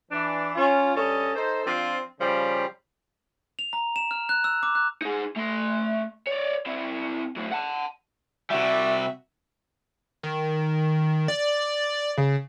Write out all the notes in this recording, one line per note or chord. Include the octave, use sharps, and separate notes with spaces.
E3 D4
C#4 F4
G2 C#4 A4 D#5
D#4 A4 C5
F3 C4 D4 F4
C#3 F3 G3 G4
F7
A#5
E7
F6
F#6
E6
D6
F#6
D#4 G#4
A3 C6
C#5 D5
C4 E4
A2 F#3
F#5 A5
C3 G3 F#4 E5
D#3
D5
C#3